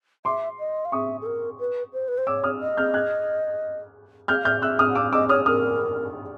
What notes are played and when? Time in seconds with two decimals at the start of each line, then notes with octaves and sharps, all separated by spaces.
0.25 E5 C6 D6
0.59 D#5
0.85 F5
0.92 E5 C#6 D#6
1.22 A4
1.26 A#4
1.60 B4
1.93 C5
2.08 B4
2.18 C5
2.27 C#5 D6 E6
2.44 D#6 F6
2.60 D#5
2.77 F6 G6
2.94 F#6 G#6
4.28 E5 F6 G6
4.36 F5
4.44 E5 F6 G6
4.62 E5 E6 F#6
4.79 D#6 F6
4.90 F#5
4.95 F5 D6 E6
5.13 D#5 D6 E6
5.29 C#5 D#6 F6
5.46 A#4 D#6 F6